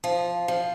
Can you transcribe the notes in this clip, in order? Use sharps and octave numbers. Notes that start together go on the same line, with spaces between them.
F3
F3